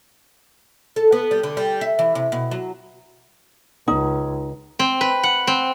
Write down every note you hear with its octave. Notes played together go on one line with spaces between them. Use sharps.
A4
B3
G3
D3
G3
E5
E3
C3
B2
F#3
C#2 D#4
C4
B4
F#5
C4